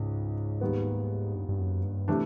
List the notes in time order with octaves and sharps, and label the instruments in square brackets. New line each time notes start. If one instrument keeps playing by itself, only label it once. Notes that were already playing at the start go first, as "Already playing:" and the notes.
Already playing: [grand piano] C#2 C#3 [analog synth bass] G#2
[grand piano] D#2 D#3 G3 B3
[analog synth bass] G2
G2
F#2
G2
[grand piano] C3 E3 A3 D4